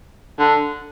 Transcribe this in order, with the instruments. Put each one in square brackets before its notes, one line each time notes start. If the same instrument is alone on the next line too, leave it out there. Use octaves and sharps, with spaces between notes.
[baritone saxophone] D3